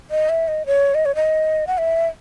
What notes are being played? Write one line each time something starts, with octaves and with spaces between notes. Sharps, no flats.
D#5
E5
D#5
C#5
D#5
C#5
D#5
F#5
E5